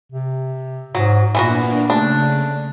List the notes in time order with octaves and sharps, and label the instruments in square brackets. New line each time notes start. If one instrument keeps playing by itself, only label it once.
[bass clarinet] C3
[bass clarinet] G#2 [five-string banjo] F#3
[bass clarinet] A#2 [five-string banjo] E3 B3 F#4 [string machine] A#3 D4
[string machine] C#3 [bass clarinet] A3 [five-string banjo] D4